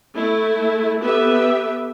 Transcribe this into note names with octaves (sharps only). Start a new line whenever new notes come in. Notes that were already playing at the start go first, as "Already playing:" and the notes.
A3 E4
B3 G4 A4 B4 E5